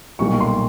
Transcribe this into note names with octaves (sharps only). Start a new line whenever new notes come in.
B1 A#2 G3 C#6
C6